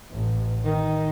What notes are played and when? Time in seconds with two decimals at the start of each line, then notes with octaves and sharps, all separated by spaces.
0.10 A1
0.64 D#3